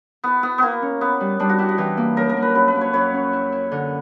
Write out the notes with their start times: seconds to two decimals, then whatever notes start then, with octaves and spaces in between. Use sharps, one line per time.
0.24 B3 E4
0.43 B3 E4
0.58 A#3 B3 E4
0.82 C#4
1.01 B3 E4
1.20 G3
1.40 G3 D4
1.49 F#4
1.58 E4 G4
1.69 F#4
1.78 E3 G4
1.97 A#3
2.17 F#2 A#4
2.29 A#4
2.37 A#3
2.42 B4
2.55 F#2 B4
2.68 B4
2.75 A#3
2.81 C#5
2.93 F#2 C#5
3.14 C#4
3.33 E4
3.52 E4
3.72 D3